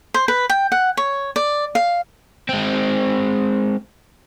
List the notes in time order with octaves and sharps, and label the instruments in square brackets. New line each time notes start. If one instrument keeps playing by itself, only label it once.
[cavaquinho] C5
B4
G5
F#5
C#5
D5
F5
[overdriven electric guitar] G#3 C4